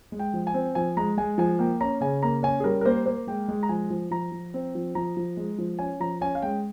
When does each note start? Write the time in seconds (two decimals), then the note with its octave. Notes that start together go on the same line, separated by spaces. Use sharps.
0.12 G#3
0.19 G5
0.34 F3
0.47 G#5
0.54 C4
0.75 F3 G#5
0.97 G#3 A#5
1.17 G#3 G#5
1.38 F3 G#5
1.59 A#3 G5
1.81 C#4 A#5
2.01 C#3 G#5
2.23 A#3 A#5
2.43 C#4 G#5
2.60 G#4
2.64 G3 A#4
2.81 A#4
2.85 A#3 C5
3.06 A#3 C5
3.27 G#3 G5
3.48 G#3
3.63 A#5
3.69 F3 G#5
3.90 F3
4.11 F3 A#5
4.32 F3
4.54 C4
4.75 F3
4.95 F3 A#5
5.17 F3
5.37 G#3
5.58 F3
5.79 C#4 G#5
6.00 F3 A#5
6.21 C#4 G#5
6.35 F5
6.42 G#3 G5